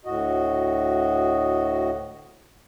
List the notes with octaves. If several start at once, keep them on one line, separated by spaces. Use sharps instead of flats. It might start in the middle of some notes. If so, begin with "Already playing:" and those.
D2 A2 F#4 D#5